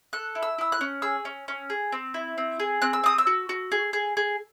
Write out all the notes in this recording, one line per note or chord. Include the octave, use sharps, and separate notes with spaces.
A4 F#6
E4
E6
E4 E6
F#6
C#4
G#4 E6
C#4
C#4
G#4
C4
E4
C4
G#4
C4 F#6
E6
C4 D#6
E6
F#4
F#4
G#4
G#4
G#4